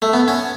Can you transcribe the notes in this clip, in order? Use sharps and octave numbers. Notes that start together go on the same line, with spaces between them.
A3
B3
C#4